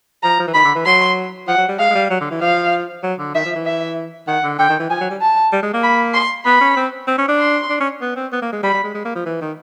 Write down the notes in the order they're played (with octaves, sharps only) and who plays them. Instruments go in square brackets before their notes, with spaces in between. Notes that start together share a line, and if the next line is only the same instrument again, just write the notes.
[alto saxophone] F3 [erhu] A#5
[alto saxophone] F3
E3
[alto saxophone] D#3 [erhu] B5
[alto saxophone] D3
E3
[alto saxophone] F#3 [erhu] C6
[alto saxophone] F3 [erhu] F#5
[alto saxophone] F#3
G3
[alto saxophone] G#3 [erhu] F5
[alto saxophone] G#3
G3
F#3
D3
E3
[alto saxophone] F3 [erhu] F5
[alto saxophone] F#3
D3
[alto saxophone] D#3 [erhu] E5
[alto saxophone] F3
E3
[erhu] E5
[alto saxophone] D#3 [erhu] F#5
[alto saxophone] D3
[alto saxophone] D3 [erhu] G5
[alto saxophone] D#3
E3
[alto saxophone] F3 [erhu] G#5
[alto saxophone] F#3
G3
[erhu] A5
[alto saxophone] G3
G#3
A#3
[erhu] B5
C6
[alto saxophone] B3 [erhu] B5
[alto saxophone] C#4
C4
C4
C#4
D4
[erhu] C6
[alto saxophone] D4
C#4
B3
C4
B3
A#3
G#3
[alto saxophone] G3 [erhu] B5
[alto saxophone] G3
G#3
G#3
A#3
F3
E3
D#3